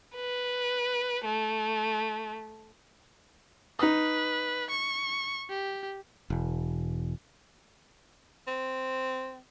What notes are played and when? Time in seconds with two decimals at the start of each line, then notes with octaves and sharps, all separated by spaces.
0.15 B4
1.25 A3
3.79 D#4 B4 D#6
4.70 C#6
5.49 G4
6.30 E1
8.47 C4